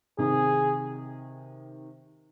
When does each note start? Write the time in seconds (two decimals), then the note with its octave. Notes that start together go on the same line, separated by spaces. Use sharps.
0.18 C3 D#3 G#4